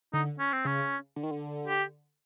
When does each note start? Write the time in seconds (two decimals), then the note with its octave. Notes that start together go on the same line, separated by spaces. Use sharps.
0.13 D3 D#4
0.39 C#4
0.53 C4
0.65 C#3 C#4
1.16 D3
1.23 D#3
1.31 D3
1.68 G4